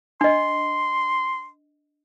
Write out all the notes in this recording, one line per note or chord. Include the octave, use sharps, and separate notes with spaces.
D4 D#5 C6